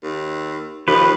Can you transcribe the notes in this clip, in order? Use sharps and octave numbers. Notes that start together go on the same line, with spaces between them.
D#2
D#2 F3 B4